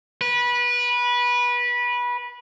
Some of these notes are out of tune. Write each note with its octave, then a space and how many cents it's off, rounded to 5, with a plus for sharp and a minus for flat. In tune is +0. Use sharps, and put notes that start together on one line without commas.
B4 -20